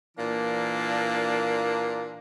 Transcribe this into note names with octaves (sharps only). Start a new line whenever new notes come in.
A#2 E3 A#3 D4